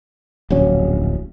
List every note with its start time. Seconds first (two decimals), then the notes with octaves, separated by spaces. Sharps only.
0.50 D1 A#1 F#3 C#4